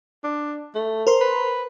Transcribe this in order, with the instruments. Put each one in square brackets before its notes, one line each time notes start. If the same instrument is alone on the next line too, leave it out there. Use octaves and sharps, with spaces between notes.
[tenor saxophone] D4
A3
[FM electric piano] A#4 C5 C6
[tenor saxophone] B4